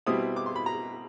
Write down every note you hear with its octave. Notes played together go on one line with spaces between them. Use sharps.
B2 G3 C4 E4 D#6
D6
C6
B5
A#5